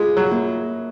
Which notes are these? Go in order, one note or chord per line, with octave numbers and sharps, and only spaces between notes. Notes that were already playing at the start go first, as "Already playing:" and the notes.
Already playing: G#3 F4
F#3
A#3